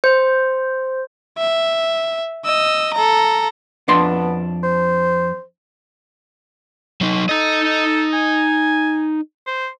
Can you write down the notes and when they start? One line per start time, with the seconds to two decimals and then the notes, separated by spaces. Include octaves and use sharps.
0.04 C5
1.38 E5
2.45 D#5 E6
2.93 A4 A#5
3.88 F2 B3 D4 C6
4.63 C5
7.01 F#3 D#4
7.29 D#4 A4 D#5
8.13 G#5
9.47 C5